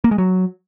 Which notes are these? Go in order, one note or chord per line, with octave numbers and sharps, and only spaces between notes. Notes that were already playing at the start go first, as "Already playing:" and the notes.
A#3
G#3
F#3